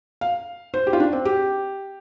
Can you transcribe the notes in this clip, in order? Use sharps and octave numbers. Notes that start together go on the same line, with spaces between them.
F5
C5
G4
F4
D4
C4
G4